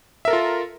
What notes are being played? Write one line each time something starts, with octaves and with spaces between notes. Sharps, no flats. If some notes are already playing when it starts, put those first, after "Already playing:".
F4 A4 A#4 E5